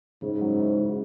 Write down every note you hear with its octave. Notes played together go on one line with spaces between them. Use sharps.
G#2 C#3
F#3
E4
C#3